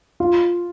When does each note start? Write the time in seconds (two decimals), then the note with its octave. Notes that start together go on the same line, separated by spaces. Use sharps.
0.20 F4